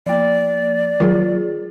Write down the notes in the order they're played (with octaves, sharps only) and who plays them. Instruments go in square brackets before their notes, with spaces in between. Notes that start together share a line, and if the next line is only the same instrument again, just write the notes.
[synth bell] F3 A#3 [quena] D5
[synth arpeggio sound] D#3 F#3 [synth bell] F4 G#4